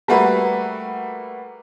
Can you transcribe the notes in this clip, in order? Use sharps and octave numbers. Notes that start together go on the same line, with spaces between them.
G3 A3 A#3 F#4 B4 E5